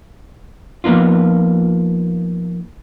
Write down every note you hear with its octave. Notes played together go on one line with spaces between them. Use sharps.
F3 A#3 B3 D#4 F4